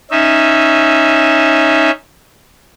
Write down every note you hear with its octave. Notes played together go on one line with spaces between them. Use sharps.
C#4 D#4 E5